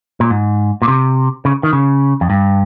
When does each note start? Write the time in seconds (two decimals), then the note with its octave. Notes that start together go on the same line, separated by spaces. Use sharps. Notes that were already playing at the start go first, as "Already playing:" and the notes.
0.20 A#2
0.30 G#2
0.82 A#2
0.88 C3
1.45 C#3
1.63 D#3
1.73 C#3
2.21 F2
2.30 G2